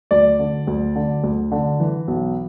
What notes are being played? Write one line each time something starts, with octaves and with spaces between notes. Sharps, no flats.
D2 D5
D3
D2
D3
D2
D3
E3
B1